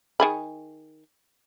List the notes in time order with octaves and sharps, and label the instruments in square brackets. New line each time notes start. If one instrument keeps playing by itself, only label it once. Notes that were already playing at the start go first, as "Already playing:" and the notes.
[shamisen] D#3 G#4 B5